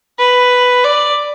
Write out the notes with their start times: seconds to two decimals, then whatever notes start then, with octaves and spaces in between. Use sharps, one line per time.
0.19 B4
0.84 D5